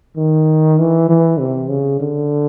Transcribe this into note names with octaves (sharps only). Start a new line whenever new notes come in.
D#3
E3
E3
C3
C#3
D3